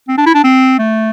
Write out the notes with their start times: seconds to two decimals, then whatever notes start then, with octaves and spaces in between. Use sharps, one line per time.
0.08 C4
0.18 D4
0.26 E4
0.34 D4
0.44 C4
0.79 A3